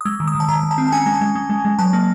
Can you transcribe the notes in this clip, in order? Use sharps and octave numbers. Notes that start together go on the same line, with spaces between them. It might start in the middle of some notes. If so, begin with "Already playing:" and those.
D#6
G#3 E6
D#3
D#6
D#3
A5
D#3 A#5
D#3
A5
C4
A5
C#4 G#5
G#3
A5
G#3
G#3
G#3
G#3
F#3 A5
A#3